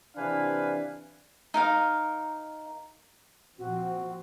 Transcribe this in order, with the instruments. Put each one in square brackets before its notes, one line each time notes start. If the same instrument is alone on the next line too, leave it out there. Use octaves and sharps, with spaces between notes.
[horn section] C3 E3 D4 B4 F5 G#5
[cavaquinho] D#4 A#4 F5
[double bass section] A#2 F3 C4 [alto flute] F#4